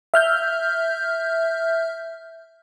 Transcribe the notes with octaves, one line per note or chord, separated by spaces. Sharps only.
E5 F6 G6